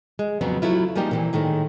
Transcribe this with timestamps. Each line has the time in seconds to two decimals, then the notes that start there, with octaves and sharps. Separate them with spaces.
0.19 G#3
0.41 F2 C#3 F#3 B3 C4
0.62 F#3 A3 E4 F4
0.95 F3 G3 G#3 A#3 D#4 G4
1.11 A#2 E3 C4
1.33 A2 D#3 G#3 A3